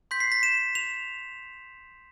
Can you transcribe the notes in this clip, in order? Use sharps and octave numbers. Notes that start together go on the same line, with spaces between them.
C6 G6 B6
C7
B6
E7
F7